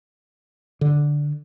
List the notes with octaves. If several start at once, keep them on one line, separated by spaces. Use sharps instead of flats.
D3